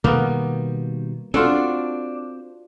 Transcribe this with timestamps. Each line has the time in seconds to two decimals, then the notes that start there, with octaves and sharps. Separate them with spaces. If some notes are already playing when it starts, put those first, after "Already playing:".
0.04 B2 D#3 G3 A#3 B3
1.34 C4 D4 F4 F#4 A4